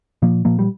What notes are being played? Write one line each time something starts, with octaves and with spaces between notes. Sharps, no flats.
A#2 F3 A#3
A#2 F3 A#3
G3